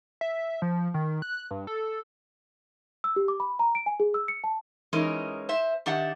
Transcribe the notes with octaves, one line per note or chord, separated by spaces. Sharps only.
E5
F3
D#3
F#6
G2
A4
E6
G4
D6
B5
A#5
D7
G#5
G#4
E6
C#7
A5
E3 G#3 C#4 D#4 A#4
C5 E5
D#3 D4 G4 E5 F#5